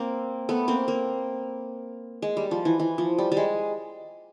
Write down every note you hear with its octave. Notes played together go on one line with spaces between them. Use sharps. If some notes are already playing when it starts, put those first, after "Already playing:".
Already playing: A#3 C4
A3 B3
A#3 C4
A#3
G#3
G3
F3
E3
E3
F3
G3
G3
G#3